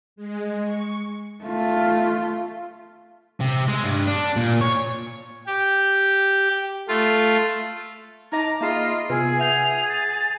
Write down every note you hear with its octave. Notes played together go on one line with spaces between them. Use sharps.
G#3
C#6
A3 F4
C3
G#3
G2
D4
A#2
C#5
G4
A3 F4
D#4 D#5 A5 A#5 D6
A#3 F4 G#4 D#5 E5 A#5 B5
C3 B3 F4 G#4 B4 G#5 E6
E5 F#5 G6 G#6 F7
A6